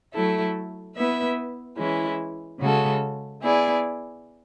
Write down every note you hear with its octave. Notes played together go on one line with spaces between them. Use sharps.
F#3 A3 E4 A4
B3 E4 B4 E5
E3 G#3 C#4 E4
C#3 G#3 C#4 F#4 A4
B3 E4 G#4 D5